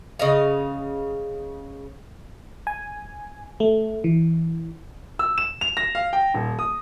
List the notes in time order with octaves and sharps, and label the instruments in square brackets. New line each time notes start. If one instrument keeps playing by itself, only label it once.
[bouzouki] C#3 D#5 F5
[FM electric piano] G#5
A3
E3
[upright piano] E6
E7
F7
A#6
F5
G5
D#1
D#6